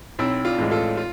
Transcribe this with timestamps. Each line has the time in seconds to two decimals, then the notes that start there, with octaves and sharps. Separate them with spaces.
0.19 B1 C4 E4
0.45 D4 F4
0.58 A2 E3 G#3
0.71 F4 A4
0.97 F4